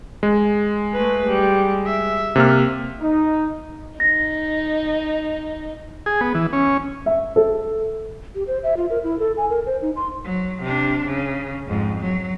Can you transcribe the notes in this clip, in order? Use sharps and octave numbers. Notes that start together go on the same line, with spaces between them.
G#3
A3 B4
G3
E5
C3 A#3 F6
D#4
D#4 A#6
G#4
B3
E3
C#4
E5
A4
G4
C5
E5
F4
A#4
E4
A4
G#5
A#4
C5
D#4
C6
F#3
C3 D4
C#3
F2 G#2
F#3